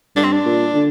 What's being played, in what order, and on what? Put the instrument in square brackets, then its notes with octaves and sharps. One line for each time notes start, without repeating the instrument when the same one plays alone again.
[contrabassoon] G2 [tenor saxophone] D4
[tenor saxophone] C4
D4
[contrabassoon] A#2
D3